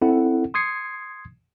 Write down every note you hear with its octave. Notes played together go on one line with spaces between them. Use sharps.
C4 E4 A4 F#5
C6 D#6 G#6 C7 C#7